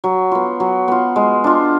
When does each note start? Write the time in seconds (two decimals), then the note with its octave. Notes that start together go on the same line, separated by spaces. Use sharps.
0.04 F#3
0.32 B3 F4
0.60 F#3
0.88 B3 F4
1.16 G#3
1.44 D4 F4